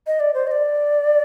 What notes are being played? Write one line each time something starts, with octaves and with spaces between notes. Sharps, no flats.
D#5
D5
C5
D#5
D5